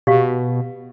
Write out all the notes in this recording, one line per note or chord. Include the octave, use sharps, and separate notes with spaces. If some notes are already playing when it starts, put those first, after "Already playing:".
B2 G4 F5